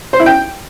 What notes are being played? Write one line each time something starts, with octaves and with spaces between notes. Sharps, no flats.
C5
E4
G5